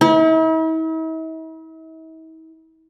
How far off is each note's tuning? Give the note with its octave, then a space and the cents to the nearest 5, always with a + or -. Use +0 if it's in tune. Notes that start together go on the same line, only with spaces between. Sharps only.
E4 -45